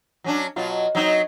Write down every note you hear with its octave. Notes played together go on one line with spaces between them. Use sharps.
F#3 C#4 D4
B2 F#3 F4
F#3 C4 D#4